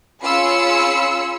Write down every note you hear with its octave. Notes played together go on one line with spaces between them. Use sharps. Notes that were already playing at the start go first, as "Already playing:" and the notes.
C#4 F4 G#4 B5 E6 C#7